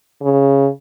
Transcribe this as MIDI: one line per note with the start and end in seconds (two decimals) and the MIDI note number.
0.22 0.68 49